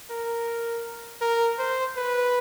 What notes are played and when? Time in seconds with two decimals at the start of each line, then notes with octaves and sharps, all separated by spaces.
0.10 A#4
1.21 A#4
1.59 C5
1.96 B4